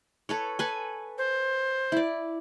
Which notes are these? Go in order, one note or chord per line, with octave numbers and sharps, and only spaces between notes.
A4 B4 C#5
A4 B4 G#5
C5
E4 D5